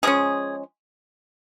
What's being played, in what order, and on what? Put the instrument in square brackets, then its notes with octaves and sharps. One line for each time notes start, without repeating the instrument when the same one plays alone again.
[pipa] F3 G#3 C#4 G#4